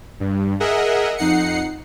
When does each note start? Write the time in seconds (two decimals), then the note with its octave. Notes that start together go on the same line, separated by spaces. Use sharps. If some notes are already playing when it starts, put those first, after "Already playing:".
0.20 G2
0.60 G#4 A#4 D#5 E5 F#5
1.17 F2 D#4 F#5 C7 C#7